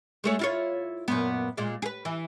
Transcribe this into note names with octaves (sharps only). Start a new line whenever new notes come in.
G#3 A3 C#5
E4 F4 C#5
F#2 A#2 B3
A#2 G#3
G#4 B4
E3